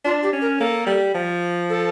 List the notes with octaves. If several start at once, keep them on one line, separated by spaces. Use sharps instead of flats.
D4 F4
G4
C#4
A#4
A#3 A4
G3
F3
A4